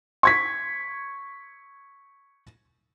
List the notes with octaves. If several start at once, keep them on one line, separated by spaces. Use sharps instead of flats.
C#6 G#6 B6